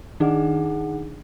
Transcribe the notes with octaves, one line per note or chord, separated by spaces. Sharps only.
D#3 D4 D#4 G#4 F#5